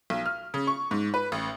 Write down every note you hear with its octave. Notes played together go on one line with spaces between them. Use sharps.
B1
F6
C#3
C#6
G#2
B4
A1